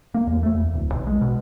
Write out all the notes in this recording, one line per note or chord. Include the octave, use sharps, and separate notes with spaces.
A#3
E2
A3
E2
D1
B1
G#3
B2